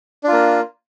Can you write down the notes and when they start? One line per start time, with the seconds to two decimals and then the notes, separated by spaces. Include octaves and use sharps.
0.24 D4
0.28 F4
0.32 A#3